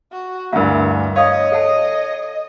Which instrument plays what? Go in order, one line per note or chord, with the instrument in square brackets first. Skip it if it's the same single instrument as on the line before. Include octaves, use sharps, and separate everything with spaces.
[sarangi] F#4
[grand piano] D2 G2 [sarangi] E3 [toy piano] A#4 E5
[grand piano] C#5 [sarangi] D#5 [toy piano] F5 D#6
[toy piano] A4 F#5 A5